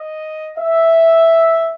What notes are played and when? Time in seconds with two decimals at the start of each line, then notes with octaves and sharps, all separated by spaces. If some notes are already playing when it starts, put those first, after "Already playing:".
Already playing: D#5
0.57 E5